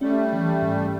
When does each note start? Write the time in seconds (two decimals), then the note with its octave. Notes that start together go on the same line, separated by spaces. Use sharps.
0.01 G3 A3 C#4
0.33 E3
0.62 G#2